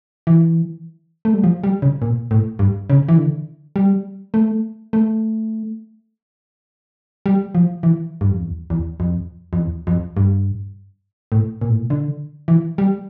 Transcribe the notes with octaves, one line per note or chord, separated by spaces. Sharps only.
E3
A3
G3
F3
G3
C#3
A#2
A2
G2
C#3
E3
D3
G3
A3
A3
G3
F3
E3
G2
F2
E2
E2
F2
F2
E2
F2
G2
A2
A#2
A2
A#2
D3
E3
G3